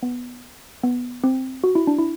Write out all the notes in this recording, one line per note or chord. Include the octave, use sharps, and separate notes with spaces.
B3
B3
C4
F#4
E4
D4
E4